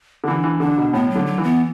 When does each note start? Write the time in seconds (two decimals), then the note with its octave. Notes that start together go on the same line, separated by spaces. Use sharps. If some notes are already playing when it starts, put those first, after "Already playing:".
0.24 D3
0.27 E3 D4
0.44 E3
0.60 D3 D4
0.78 B2
0.93 A2 B3
1.10 F#3
1.16 D3
1.26 F#3
1.38 E3
1.43 B3